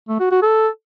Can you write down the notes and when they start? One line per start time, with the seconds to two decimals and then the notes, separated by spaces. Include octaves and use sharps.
0.09 A3
0.20 F#4
0.31 F#4
0.42 A4